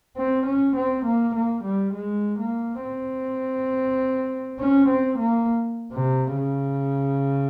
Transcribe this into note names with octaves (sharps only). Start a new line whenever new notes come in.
C4
C#4
C4
A#3
A#3
G3
G#3
A#3
C4
C#4
C4
A#3
C3
C#3